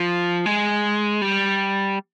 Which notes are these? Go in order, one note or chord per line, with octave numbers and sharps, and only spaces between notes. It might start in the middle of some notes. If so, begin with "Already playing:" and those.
Already playing: F3
G#3
G3